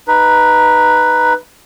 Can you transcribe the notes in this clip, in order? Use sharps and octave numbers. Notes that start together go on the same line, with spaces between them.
D#4 B4